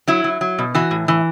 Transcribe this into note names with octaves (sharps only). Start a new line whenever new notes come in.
F#3 E4
F#3
F#3
B2
E3 F#4
A2
E3